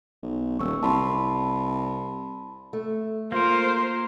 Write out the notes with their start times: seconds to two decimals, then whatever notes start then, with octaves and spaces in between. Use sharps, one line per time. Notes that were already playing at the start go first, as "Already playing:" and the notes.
0.23 B1
0.59 D#1 C#6 E6
0.83 C2 A5 B5 C6
2.73 A3
3.32 A#3 F4 A#4 C5